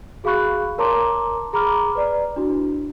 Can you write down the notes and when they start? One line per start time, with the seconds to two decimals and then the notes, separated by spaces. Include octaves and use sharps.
0.24 F#4 G#4 F5 B5 C#6 F#6
0.78 A#4 C#5 A5 A#5 C6 D6
1.53 G#4 A#5 B5 D6 F6
1.95 B4 D5 A#5
2.36 D4 E4 F#4